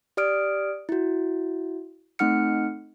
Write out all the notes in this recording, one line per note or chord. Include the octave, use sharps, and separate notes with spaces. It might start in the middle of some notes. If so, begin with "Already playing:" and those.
G4 D5 D#6 F6 D7
E4 F#4
A3 C4 D#4 F#5 F6 C#7